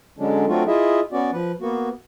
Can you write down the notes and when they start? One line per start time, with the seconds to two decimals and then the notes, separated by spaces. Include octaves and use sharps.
0.19 D3 F#3 G#3 C#4 D4
0.48 F#3 A3 C4 D4 F4 F#4
0.67 E4 F4 G#4 D#5 E5
1.12 B3 C#4 F#4 D5
1.32 F3 B4
1.61 A#3 B3 F#4